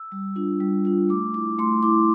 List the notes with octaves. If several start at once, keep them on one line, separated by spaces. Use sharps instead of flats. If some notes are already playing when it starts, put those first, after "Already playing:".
Already playing: E6
G3
D4 F4
G3
D4 F4
A3 D6
E4 D6
A3 C6
E4 D6